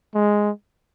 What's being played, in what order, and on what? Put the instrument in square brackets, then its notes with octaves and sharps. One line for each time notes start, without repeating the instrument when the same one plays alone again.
[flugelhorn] G#3